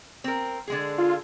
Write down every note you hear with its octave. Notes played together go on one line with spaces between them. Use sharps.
C4 A#4
D3 G#3 G#4
F4